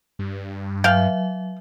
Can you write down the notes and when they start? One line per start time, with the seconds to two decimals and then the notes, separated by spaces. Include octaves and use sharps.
0.19 G2
0.84 F#3 E5 F5 G5